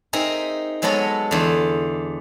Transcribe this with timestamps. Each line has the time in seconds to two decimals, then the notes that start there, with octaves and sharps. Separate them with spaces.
0.13 C4 D#4 G#4 A#4 E5
0.82 F#3 G#3 B3 A4 C#5 D#5
1.31 E2 D3